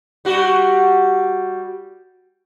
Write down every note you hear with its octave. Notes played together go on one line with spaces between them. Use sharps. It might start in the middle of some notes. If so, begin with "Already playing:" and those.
G3 F#4